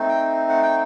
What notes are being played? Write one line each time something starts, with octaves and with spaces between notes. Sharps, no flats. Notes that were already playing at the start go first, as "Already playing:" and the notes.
Already playing: A3 C4 D#4
G5
F#5
G5